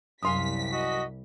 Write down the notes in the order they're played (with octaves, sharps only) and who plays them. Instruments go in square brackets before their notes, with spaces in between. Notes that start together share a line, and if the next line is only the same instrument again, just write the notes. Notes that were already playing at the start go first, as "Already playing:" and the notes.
[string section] C2 B6 [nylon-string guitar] F#2 F5 G#5 [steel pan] C6 D#6
[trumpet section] F#4 D#5